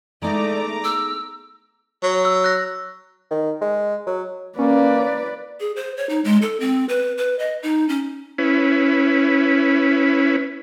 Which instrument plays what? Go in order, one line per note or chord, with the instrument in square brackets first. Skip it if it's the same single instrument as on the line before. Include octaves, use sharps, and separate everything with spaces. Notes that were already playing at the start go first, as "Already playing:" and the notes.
[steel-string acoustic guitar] G#3 B3 D#4 [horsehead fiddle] A3 [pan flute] D5 [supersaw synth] A#5 D6
[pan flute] E6
[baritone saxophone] F#3
[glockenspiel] E6
F#6 A#6
[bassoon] D#3
G#3
F#3
[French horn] A#3 [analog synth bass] C#4 [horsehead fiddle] B4 D5
[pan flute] G#4
C5
C#5
D#4
G#3
A4
C4
B4
B4
D#5
D#4
C#4
[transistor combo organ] C#4 E4 B4